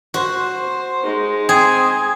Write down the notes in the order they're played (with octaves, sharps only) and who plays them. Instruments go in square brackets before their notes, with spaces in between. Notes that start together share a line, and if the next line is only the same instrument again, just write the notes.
[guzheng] F#4 [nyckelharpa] C5
[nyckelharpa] G#3 D#4
[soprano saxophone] C4 [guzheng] G#4